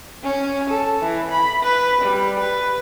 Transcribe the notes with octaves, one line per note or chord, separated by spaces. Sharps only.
C#4
A4
E3
B5
B4
G3
B4